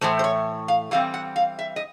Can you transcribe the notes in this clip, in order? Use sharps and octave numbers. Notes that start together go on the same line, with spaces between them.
A2 E3 A3 C5
C5
C#5
F5
E3 G3 C4 F5
F#5
F5
E5
D#5